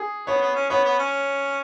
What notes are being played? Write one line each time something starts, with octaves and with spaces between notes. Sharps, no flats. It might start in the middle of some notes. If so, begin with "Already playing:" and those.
Already playing: G#4
B3 C#5
B3
C#4
B3 C#5
B3
C#4